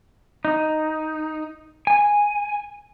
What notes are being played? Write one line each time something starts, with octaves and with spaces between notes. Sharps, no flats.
D#4
G#5